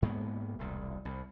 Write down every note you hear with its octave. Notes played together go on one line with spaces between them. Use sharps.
G#2 G#3 A#3 B3
E1 C2
C2